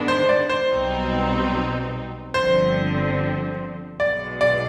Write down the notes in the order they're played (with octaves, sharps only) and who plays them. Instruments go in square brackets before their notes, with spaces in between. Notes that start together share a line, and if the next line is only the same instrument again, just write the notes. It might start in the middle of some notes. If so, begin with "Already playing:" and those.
Already playing: [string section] G#2 D#3 G#3 B3 D4
[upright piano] C5
D5
C5
[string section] B1 B2 G3 C4 D#4
[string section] G1 G2 D3 F3 C4 [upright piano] C5
[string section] B1 B2 G#3 [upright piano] D5
[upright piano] D5